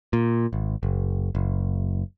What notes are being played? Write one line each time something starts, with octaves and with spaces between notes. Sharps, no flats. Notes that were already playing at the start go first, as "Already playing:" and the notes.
A#2
G#1
F#1
F#1